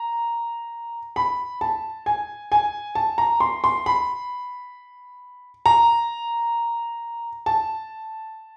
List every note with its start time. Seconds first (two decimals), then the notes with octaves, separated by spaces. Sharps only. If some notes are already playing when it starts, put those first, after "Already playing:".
Already playing: A#5
1.16 B5
1.61 A5
2.06 G#5
2.52 G#5
2.95 A5
3.18 A#5
3.40 C6
3.64 C6
3.86 B5
5.66 A#5
7.46 A5